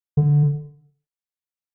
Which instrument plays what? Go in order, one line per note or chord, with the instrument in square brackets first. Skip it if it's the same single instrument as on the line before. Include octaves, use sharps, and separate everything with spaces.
[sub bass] D3